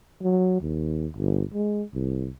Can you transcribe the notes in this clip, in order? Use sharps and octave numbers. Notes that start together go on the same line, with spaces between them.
F#3
D#2
G1
G#3
C2